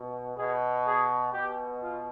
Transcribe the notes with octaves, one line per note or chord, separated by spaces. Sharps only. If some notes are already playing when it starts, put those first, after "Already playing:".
Already playing: B2
B2 G#4
G#4
B2 G4
F4